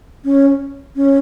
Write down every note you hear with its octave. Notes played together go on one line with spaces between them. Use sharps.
C#4
C#4